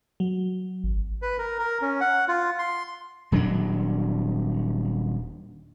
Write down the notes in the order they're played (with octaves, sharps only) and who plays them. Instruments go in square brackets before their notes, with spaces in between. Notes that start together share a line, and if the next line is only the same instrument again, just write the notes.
[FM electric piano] F#3
[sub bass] G#1
[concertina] B4
A#4
A#4
C#4
F#5
F4
C6
[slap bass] D#1 F#3 C4 D4